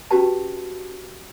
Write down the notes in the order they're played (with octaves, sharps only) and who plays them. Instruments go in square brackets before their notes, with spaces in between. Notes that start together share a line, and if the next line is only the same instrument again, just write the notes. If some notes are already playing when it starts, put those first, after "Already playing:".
[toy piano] C#4 F#4 G4 B4 A5